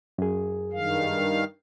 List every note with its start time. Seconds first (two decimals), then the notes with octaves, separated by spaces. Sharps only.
0.18 F#2 G#4
0.73 G2 D#3 F5